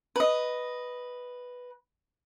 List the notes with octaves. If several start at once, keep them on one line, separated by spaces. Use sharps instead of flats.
B4 D#5